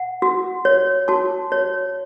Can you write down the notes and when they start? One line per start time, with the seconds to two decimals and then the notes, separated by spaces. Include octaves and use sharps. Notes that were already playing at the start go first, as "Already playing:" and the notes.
Already playing: F#5
0.22 F#4
0.65 C#5
1.08 F#4 A5
1.52 C#5